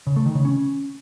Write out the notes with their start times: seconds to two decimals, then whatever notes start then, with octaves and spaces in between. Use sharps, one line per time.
0.07 C#3
0.16 A3
0.26 D#3
0.35 C#3
0.45 C#4